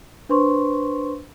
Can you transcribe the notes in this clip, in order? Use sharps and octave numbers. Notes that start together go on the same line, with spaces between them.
D4 B4 C5 C6 C#6